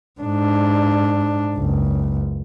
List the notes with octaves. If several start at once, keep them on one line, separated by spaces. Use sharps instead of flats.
G#2 D4
F#1 C#2